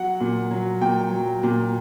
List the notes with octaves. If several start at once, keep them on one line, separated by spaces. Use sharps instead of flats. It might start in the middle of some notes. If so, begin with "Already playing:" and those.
Already playing: F#3 F#5
A#2
F#3
A#2 G5
F#3
A#2